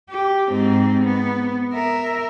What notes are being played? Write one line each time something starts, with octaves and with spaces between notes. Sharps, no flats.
G4
G#2 C4
B3
A#4 E5